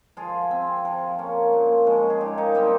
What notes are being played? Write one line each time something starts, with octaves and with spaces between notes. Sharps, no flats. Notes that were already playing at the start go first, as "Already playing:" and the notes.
F3 F4 G#4
C4
F3
A#3 C#4
A#2
F3 G#3 C#4
G#4
A#2 D#4 G4
D#4
G3 C4 D#4 G4